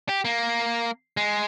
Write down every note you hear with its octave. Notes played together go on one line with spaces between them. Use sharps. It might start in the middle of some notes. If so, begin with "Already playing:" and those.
G4
A#3
G#3